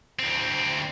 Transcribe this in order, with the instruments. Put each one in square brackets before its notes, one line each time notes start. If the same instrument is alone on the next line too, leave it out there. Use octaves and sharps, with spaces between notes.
[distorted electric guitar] D2 C4